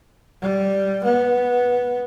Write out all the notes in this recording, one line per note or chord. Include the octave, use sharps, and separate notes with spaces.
G3
B3